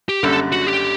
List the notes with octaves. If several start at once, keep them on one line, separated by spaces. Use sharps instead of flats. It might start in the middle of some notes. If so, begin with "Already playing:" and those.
G4
F#1 F#2 D3 G3 A4
F#4
G4